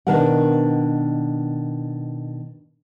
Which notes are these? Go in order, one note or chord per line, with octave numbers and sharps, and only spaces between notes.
B2 D#3 D4 A#4 B4 F#5